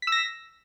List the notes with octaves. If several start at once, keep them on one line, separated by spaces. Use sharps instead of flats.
E6 A#6 B6